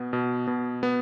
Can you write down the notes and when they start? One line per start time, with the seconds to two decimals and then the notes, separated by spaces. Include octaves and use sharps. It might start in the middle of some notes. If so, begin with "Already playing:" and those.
Already playing: B2 B3
0.13 B2
0.47 B2
0.83 B3